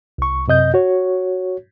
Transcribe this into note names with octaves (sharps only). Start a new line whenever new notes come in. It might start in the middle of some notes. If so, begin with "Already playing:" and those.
C2 C#6
F#2 C3 D#5 G6
F#4 C#5